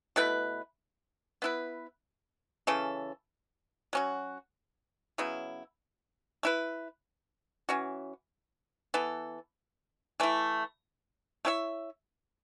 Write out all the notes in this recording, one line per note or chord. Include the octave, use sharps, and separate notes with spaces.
B2 A3 E4 B4
B3 E4 B4
C#3 E3 C#4 A4
F#3 C#4 F#4
C#3 F#3 B3 E4
A3 E4 B4
E3 C#4 F#4
E3 B3 A4
E3 A3 E4
A3 E4 C#5 E5